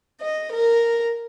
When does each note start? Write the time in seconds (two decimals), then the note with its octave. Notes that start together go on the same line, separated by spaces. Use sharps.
0.21 D#5
0.52 A#4